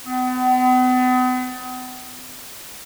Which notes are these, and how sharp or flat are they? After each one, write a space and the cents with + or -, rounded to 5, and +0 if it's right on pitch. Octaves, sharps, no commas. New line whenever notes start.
B3 +40